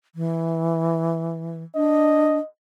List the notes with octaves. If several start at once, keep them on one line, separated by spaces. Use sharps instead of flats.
E3
D4 D#5